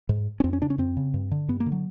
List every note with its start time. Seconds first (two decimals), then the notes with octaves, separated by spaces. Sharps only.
0.09 G#2
0.40 C#4
0.44 F2 C4
0.53 C#4
0.62 C#3 D4
0.70 C#4
0.78 F2 C4
0.97 C#3
1.14 G2
1.31 D3
1.48 G2 B3
1.60 A#3
1.66 D3
1.72 F#3